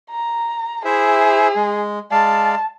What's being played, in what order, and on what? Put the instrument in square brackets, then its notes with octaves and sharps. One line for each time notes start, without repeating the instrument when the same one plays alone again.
[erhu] A#5
[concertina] E4 C5 E5 [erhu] G#4
[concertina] G#3
[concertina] G#3 D5 F5 [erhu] A5